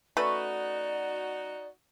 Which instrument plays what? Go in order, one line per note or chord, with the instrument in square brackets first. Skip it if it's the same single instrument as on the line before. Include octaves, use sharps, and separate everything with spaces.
[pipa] A3 C#4 B4 [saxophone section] D#4 F#4 [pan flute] D5